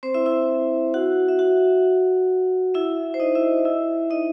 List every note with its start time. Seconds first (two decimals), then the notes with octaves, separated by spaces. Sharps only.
0.03 C4 C5
0.14 E4 E5
0.26 E4 E5
0.94 F#4 F#5
1.28 E5
1.39 F#4 F#5
2.74 E4 E5
3.14 C5
3.20 D#4 D#5
3.35 E4 E5
3.65 E4 E5
4.10 D#4 D#5